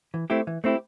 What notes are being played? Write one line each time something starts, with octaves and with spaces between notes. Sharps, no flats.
E3
A3 C4 E4 G4
E3
A3 C4 E4 G4